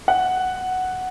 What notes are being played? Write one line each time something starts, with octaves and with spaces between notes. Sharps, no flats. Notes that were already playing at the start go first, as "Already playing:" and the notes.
F#5